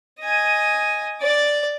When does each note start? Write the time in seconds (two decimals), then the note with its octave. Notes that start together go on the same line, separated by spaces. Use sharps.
0.21 D#5 G#5
1.22 D5 D6